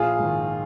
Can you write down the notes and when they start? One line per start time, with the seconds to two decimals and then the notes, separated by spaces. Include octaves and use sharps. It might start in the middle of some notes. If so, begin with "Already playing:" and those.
Already playing: A#1 F4 G#4
0.19 G#2 D#3